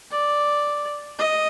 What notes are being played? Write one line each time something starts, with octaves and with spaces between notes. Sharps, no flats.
D5
D#5